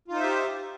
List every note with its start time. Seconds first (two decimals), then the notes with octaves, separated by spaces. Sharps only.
0.08 F4
0.12 D#4
0.16 C5
0.19 E5
0.23 G4